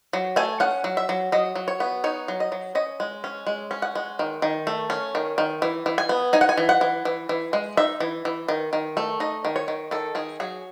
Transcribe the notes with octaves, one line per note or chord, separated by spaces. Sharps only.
F#3
A3 G#5
C#4 F#5
F#3
E5
F#3
F#3 D#5
F#3
C#5
B3
D#4 C#5
F#3
D#5
F#3
C#4 D#5
G#3
C#4
G#3
C#4
F#5
G#3
D#3
D#3
A3
C#4
D#3
D#3
E3
E3
G#5
B3
D#4 G#5
F#5
G#5
E3
F#5
E3
E3
E3
G#3
D#4 E5
E3
E3
D#3
D#3
A3
D#4 D#5
D#3
C#5
D#3
D#3 A4
D#3 G#4
F#3 G#4